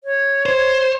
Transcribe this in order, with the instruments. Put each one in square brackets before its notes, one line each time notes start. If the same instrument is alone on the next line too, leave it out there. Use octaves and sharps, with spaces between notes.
[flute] C#5
[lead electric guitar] C5